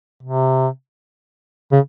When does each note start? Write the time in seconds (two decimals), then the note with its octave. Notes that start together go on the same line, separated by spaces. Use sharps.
0.23 C3
1.72 C#3